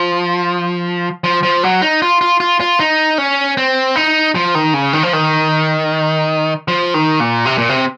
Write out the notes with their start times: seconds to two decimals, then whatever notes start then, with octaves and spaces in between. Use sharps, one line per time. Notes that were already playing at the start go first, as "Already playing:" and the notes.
Already playing: F3
1.24 F3
1.43 F3
1.63 F#3
1.82 D#4
2.02 F4
2.21 F4
2.40 F4
2.60 F4
2.80 D#4
3.18 C#4
3.57 C4
3.96 D#4
4.35 F3
4.55 D#3
4.74 C#3
4.93 D#3
5.03 F3
5.13 D#3
6.68 F3
6.94 D#3
7.20 A#2
7.45 C3
7.58 A#2
7.69 C3